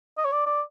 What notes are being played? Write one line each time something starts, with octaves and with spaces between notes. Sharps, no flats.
D#5
C#5
D5
D5